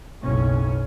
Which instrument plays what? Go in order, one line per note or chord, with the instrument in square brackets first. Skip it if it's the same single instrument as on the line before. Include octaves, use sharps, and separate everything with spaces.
[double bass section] F#1 B1 C#4